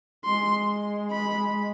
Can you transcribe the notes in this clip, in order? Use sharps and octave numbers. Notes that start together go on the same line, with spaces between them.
G#3 C6
B5